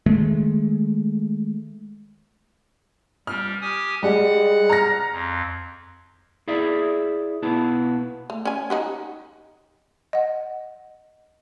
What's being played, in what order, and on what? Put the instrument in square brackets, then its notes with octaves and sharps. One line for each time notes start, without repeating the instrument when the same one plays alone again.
[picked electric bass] D#3 G#3 A3
[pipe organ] G3 [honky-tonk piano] F6
[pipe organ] G4 G#5 D#6
[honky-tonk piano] G3 [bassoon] G#3 [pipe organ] F#5 F#6
[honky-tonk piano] A#5 F6 A#6
[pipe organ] F2
[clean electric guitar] E4 G#4 D5 E5
B1 B3 E4 A5
[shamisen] A3
C#4 G#5
D#4 F#4 G4
[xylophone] D#5 F#5